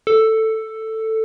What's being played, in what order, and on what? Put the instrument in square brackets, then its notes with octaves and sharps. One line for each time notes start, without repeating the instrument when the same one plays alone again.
[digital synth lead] A4